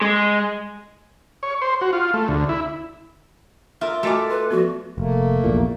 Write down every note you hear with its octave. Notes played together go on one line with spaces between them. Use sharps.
G#3
C#5
C5
F#4
F4
A3
D2
E4
F4 A#4 D5 E5
A3 F#4 A#4 D#5 G#5 A5 D6
B4 C6
F3 B3 F#4
F1 A3 A#3
A#1 E2 A#2